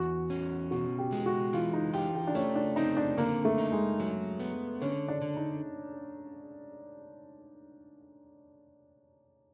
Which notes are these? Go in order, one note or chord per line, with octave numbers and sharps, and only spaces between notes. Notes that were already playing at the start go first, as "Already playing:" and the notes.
Already playing: E2 F#4
C#4
B2 F#4
G4
G#3
F#4
E3 F4
D#4
F4 G4
G4
D4
A3 C#4
D4
C4 D#4
D4
D3 A#3
A3
D#4
G#3
F#3
B3
D3 C#4
D4
D3
D#4